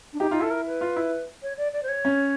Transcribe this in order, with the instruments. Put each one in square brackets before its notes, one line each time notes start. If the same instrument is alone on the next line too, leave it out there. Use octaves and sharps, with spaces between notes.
[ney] D4
[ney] D#4 [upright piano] G4
[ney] D#4 [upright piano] F4
[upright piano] E4 [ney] A4
[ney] A#4
B4
[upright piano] F4
E4
[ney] C#5
D5
D5
C5
C#5
[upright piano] C#4